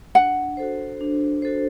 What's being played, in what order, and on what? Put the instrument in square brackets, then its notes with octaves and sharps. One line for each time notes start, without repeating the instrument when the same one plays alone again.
[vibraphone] D4 [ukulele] F#5
[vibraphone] F#4 A4 C5
D4
F#4 A4 C5